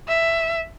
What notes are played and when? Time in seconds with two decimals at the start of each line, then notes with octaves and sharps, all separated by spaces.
0.08 E5